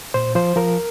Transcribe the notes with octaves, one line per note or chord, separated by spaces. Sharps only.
A#2 C5
F3 C5
F3 A#4